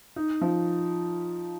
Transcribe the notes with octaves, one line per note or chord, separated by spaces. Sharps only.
D#4
F3